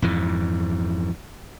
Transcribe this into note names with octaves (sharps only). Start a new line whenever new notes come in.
F2 G#2 E3